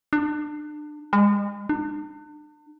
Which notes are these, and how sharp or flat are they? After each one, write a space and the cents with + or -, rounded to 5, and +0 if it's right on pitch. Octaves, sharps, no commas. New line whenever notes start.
D4 +30
G#3 -35
D4 +40